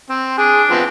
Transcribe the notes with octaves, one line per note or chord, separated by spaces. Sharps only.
C4
D4 G#4
F3 B3 C4